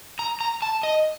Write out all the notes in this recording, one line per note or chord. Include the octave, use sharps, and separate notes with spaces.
A#5
A#5
A5
D#5